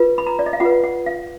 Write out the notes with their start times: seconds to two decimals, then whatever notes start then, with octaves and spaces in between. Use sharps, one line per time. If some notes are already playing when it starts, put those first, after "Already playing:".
Already playing: F4 B4
0.18 B5
0.27 A#5
0.39 D5
0.46 D#5
0.53 F5
0.60 F4 B4 F#5
0.84 F#5
1.06 F5